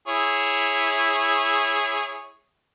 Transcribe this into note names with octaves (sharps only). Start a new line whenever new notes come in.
E4 G#4 C#5